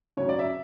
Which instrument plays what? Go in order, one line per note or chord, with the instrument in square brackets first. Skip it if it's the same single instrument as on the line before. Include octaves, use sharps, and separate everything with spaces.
[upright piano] C#3 F#3 C#4 C#5
D5
E5